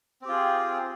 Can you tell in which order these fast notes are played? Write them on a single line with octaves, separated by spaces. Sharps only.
C4 G4 F4 G#4